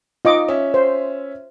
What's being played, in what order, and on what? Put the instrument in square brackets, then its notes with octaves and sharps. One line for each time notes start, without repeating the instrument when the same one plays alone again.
[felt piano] D#4 [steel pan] F4 D#5 D6
[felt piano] C#4 E5
[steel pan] C5